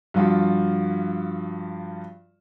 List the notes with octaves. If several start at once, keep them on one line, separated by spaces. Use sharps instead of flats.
G2 F3 F4 F#4